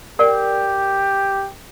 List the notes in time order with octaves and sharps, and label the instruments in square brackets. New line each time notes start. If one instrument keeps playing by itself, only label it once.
[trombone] G4 [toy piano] A#4 D5 F#5